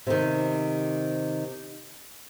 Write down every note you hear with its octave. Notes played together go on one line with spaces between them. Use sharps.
C3 D#3